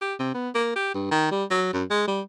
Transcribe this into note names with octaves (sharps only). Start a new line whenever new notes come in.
G4
C3
B3
A#3
G4
G2
D#3
G3
F#3
F#2
G#3
G3